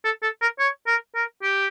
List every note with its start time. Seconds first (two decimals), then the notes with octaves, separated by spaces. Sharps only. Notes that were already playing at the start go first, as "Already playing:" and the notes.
0.04 A4
0.23 A4
0.41 A#4
0.59 C#5
0.87 A#4
1.15 A#4
1.42 G4